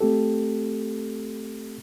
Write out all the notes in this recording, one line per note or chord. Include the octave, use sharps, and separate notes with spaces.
A3 C4 G4 A4